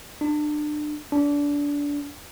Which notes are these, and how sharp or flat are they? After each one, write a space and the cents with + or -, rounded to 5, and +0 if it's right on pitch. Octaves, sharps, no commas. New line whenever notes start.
D4 +30
D4 -25